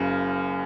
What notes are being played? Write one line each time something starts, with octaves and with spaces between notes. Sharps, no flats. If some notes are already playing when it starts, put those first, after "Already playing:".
Already playing: F#1 F#2 C#3